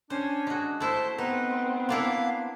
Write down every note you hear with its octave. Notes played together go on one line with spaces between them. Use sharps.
C#4 D4 C5
G#3 F#4
A3 E4 C5 A5
B3 C4 D#4 B4
A#3 D4 E4 F5